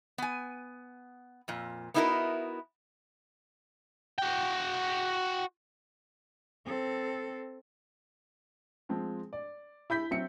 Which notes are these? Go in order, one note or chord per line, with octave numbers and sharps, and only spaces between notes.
B3 G#5
F2 A#2
B3 D#4 E4 F#4 A4 A#4
F#4 G5
C4 A4
F3 G#3 C4
D5
E4 B5 G6 B6
F#3 C4 E5 C#7